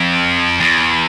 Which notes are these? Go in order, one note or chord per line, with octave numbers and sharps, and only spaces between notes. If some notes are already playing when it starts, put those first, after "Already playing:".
Already playing: F2
E2